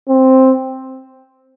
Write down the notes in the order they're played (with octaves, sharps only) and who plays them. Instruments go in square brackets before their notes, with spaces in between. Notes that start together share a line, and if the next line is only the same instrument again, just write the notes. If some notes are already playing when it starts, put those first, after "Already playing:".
[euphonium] C4